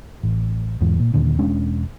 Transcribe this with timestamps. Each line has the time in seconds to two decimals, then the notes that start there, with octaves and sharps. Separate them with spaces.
0.23 A1
0.81 E2 G#2 E3
1.00 A#2
1.14 D#2 A#2 D3
1.39 E1 G#3 C#4 D4